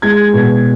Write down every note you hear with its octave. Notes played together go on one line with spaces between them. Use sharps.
G#3 G#6
B2